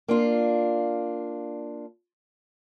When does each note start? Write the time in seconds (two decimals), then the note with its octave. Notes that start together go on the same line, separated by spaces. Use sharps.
0.08 A#3 D4 F4